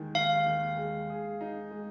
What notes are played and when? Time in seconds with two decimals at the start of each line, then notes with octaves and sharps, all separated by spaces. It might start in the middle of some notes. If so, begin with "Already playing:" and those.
Already playing: D#2 D#3 G#3
0.15 D#2 F5
0.46 D#2
0.77 G#3
1.10 G#4
1.41 D#4
1.71 G#3